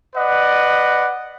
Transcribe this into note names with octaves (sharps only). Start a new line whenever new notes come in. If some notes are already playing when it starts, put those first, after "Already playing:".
B4 D5 D#5 F#5